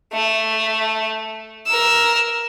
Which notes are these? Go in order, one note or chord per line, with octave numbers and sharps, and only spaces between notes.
A3
A#4 E6